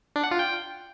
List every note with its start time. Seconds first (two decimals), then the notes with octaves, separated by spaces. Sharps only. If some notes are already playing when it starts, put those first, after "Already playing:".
0.16 D4
0.23 F#5
0.31 F4
0.39 G5